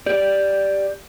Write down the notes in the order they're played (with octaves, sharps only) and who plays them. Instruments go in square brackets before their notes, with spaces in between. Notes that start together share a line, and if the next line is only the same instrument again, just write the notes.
[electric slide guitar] G4 D5